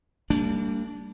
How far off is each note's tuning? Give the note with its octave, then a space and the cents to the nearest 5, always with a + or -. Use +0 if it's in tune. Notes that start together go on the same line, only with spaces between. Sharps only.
G3 +0 A#3 -45 D4 -15